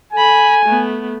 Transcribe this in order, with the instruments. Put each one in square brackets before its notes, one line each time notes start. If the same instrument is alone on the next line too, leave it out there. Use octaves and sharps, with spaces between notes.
[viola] A4 B5 [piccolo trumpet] G#5
[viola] A3 B3